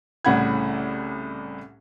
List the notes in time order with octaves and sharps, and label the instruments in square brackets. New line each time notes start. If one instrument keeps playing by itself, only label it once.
[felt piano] C2 A2 C#3 F#5 B5 G#6